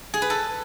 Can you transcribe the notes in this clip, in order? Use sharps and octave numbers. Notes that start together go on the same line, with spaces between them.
G#4
B4
A4